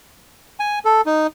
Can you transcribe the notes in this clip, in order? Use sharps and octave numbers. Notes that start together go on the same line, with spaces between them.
G#5
A4
D#4